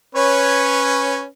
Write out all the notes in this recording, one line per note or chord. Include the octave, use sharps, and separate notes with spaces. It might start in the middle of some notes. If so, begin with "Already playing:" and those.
C#4 B4 C#5